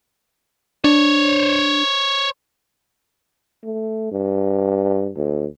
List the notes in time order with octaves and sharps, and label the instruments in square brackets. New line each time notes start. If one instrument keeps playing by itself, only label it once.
[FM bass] D4 [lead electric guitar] C5 C#5
[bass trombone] A3
G2
D2